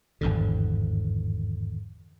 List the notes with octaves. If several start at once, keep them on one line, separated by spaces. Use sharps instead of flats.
G#1 E2 G2 D3